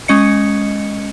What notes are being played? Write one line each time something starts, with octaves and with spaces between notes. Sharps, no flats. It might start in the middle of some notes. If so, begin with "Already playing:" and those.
G#3 C#4 D#5 C#7